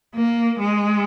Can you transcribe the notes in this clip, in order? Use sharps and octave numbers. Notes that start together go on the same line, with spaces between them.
A#3
G#3